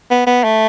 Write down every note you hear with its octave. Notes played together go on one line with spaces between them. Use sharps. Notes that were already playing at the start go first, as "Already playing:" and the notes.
B3
B3
A3